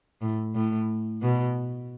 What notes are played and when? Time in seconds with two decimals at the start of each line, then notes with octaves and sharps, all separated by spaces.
0.22 A2
0.55 A2
1.22 B2